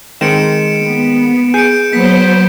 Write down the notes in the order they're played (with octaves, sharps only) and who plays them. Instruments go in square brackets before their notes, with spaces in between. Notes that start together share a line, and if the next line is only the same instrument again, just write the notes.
[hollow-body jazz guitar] D#3 G#3 C4 [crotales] C#7 D7 E7
[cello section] B3
[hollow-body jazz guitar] G#4 [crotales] G6 C#7 D7
[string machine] F#3 C5 [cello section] B3 [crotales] B6